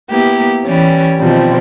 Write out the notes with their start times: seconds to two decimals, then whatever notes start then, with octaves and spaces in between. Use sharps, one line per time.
0.10 A#3 B3 E4 G4
0.65 E3 G3 C#4
1.18 B2 D#3 F3 G3 C4